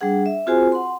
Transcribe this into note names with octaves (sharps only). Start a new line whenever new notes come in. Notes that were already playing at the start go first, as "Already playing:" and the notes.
G3 D4 G#4 F#5
E5
C4 F4 F#4 G#4 C5 G#5
F#5 C6